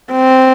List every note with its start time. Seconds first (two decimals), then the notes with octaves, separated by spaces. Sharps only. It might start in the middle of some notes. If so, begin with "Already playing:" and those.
0.12 C4